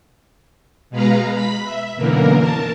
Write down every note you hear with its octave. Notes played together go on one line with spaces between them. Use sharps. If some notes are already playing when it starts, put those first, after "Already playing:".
B2 G#3 B4 F5 A#5
B5 B6
E5
F#2 B2 D3 E3 A#3 A#4
A#4 A5